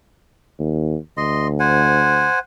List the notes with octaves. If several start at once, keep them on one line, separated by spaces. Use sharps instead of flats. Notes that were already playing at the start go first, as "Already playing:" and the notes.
D#2
D2 D#5 C6
C5 F#5 G#5